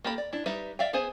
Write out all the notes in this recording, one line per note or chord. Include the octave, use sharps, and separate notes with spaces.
A#3 G4 A4 B5
D5
D4 E4
G3 D#4 B4 E5
D5 E5 F5 G5
B3 G#4 C5 G#5